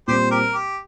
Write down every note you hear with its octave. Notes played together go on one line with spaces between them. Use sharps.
A#2 G3 C4 G4 C5
G4 A#4
G4